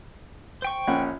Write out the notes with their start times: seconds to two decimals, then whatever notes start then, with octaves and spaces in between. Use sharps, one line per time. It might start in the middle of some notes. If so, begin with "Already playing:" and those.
0.62 C5 G5 C#6
0.87 A#1 C#4 F#5